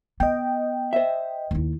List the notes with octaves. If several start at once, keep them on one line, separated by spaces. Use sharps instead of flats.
B3 D#5 G5
C5 E5
D#2 E4